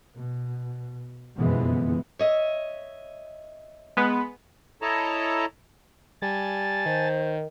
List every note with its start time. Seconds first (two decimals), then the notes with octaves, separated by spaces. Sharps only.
0.19 B2
1.36 F#1 F2 B2 E3 G#3 B3
2.19 C#5 D#5 E5
3.97 G#3 B3 B4
4.82 E4 A4 C#5 D#5 A5 A#5
6.22 G3 G#5 A5 A6
6.86 D#3 C5